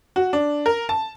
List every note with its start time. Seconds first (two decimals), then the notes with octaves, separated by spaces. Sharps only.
0.16 F#4
0.33 D4
0.66 A#4
0.89 A5